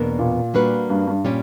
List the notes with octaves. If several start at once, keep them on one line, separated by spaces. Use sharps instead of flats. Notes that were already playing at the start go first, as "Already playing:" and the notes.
Already playing: E2 B2 A#3 D4 A#4
A#2
G3 A#3 D4 F#4 B4
G2
G2
A#2 G3 C#4 G4